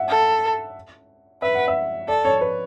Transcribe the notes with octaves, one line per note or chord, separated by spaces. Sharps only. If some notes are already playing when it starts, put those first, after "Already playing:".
Already playing: E5 F#5
A4
B4 E5
F#5
E5
A4 D5
C#5
B4